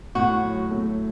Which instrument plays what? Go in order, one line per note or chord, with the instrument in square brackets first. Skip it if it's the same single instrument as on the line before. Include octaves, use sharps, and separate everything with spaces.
[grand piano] A2 [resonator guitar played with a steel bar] F#4
[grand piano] F#3
A3